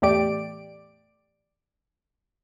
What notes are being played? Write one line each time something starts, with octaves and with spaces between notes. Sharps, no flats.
E2 A2 A3 G4 D5 D7